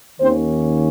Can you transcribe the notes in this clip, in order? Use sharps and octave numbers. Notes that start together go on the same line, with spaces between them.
D#2 D#3 A#3 C4 C#4 C5